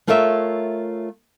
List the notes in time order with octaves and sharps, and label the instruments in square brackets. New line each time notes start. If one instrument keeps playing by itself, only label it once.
[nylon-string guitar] A3 F4 A#4 C#5 D#5 E5